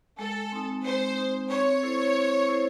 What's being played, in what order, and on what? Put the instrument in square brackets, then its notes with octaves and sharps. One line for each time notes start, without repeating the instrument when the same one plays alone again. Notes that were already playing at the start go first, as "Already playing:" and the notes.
[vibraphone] G#3 [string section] A4
[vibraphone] C4 D#4
[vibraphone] G#3 [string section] C5
[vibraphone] C4 D#4
[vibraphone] C4 [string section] C#5
[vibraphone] E4 A4 C5
C4
E4 A4 C5